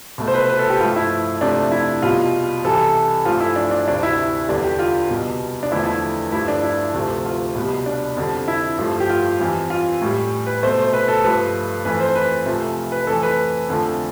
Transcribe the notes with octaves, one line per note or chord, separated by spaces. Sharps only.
C2 B2 A3
C5
B4
B4
A4
G4
G2 F3 A3 F4
E4
F2 C3 F3 A3 D4
E4
C2 B2 G3 F4
C2 C3 E3 G3 A4
G2 F3 A3 F4
E4
D4
D4
D2 C3 G3 D4
E4
E2 D3 G3 D4
G4
F4
C2 B2 G3
D4
E2 D3 F3 A3 E4
E4
G2 F3 A3 E4
D4
E4
D2 C3 F3 A3
F4
C2 B2 G3
D4
F2 D3 G3
E4
G2 F3 A3
G4
F4
F2 E3 G3
F4
A2 G3
B4
C2 B2 A3 C5
C5
B4
A4
G2 F3 A3 B4
F2 E3 A3 B4
C5
B4
C2 C3 F3 A3
B4
F2 E3 A3 A4
B4
F2 D3 F3 A3